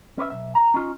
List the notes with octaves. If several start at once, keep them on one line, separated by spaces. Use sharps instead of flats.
C#4 B4 C#5 E5
B1 G#2 E5
A#5
C#4 D#4 F4